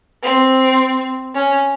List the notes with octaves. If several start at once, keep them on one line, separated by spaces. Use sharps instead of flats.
C4
C#4